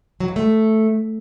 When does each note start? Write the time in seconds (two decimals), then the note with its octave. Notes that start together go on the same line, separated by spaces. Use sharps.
0.20 F#3
0.28 G2
0.36 A3